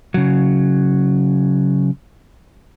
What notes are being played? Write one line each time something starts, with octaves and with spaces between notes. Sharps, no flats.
C#3 F#3